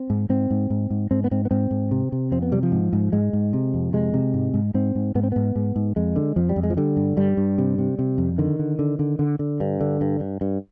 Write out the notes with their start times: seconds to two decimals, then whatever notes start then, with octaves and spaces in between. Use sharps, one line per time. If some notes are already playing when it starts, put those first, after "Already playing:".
Already playing: C4
0.10 G#2
0.29 G#2 C4
0.50 G#2
0.70 G#2
0.90 G#2
1.11 G#2 C4
1.24 B3
1.31 G#2 C4
1.45 B3
1.51 G#2 C4
1.71 G#2
1.91 C3
2.12 C3
2.32 F2 C4
2.42 B3
2.52 C3 G3
2.63 F3
2.72 G#2
2.93 G#2
3.12 G#2 G#3
3.33 G#2
3.53 C3
3.74 F2
3.93 C3 G#3
4.14 C3
4.34 G#2
4.54 G#2
4.74 G#2 C4
4.95 G#2
5.15 G#2 B3
5.23 C4
5.32 G#2 B3
5.56 G#2
5.76 G#2
5.96 F2 G#3
6.16 D3
6.36 F2 F3
6.49 G3
6.56 F2
6.63 G#3
6.70 F3
6.77 D3 G3
6.97 G2
7.17 G2 G3
7.37 G2
7.58 C3
7.78 C3
7.99 C3
8.18 F2
8.38 D3 D#3
8.59 D3
8.79 D3
8.99 D3
9.19 D3
9.39 D3
9.60 G2
9.81 D3
10.01 G2
10.20 G2
10.41 G2